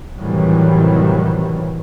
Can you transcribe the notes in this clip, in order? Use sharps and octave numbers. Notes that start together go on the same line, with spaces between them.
A2 C3 D#3 E3 F#3 G3